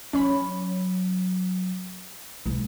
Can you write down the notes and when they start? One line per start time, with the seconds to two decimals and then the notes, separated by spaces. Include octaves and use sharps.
0.13 F#3 C#4 C#5 B5
2.46 B1 G#3